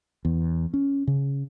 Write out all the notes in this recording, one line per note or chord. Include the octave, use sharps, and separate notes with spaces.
E2
C#4
C#3